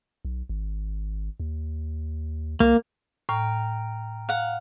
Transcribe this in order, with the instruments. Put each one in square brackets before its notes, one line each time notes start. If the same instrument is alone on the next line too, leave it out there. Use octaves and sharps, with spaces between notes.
[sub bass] B1
G#1
D#2
[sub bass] C2 [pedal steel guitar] A#3
[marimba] A2 [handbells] G5 A#5 F6
[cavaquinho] F5 F#5